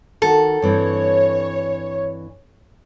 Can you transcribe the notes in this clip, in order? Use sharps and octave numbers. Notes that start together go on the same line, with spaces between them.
D#3 F#4 A4
G2 E3 C4 C#5